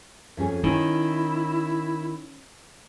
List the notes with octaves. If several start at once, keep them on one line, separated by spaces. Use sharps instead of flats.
F2 C#4 G#4
D#3 C#4 E4